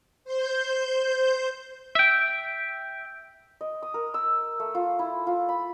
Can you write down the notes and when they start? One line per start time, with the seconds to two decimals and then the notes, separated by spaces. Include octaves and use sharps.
0.24 C5 G6
1.95 E5 G5
3.61 D#5
3.82 D#6
3.94 A#4
4.14 E6
4.60 A3
4.75 F4
4.99 E4
5.27 F4
5.49 B5